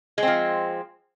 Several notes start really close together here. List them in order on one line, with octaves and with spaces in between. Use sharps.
G#3 C4 F3